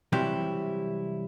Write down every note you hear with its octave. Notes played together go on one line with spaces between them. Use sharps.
C3 E3 F#3 G3 E4 G4